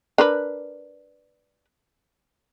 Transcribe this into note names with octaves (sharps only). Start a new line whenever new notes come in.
D4 A#4 B4